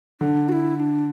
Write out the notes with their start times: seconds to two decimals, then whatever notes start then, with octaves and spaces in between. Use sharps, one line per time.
0.21 D3 D4
0.49 F#4
0.52 E4
0.76 E4
0.80 D4